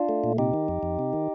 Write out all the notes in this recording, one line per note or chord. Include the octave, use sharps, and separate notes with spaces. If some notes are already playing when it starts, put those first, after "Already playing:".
Already playing: D4 F4
A3
A#2
C3 D#4 G4
D#3
F2
F2
C3
D#3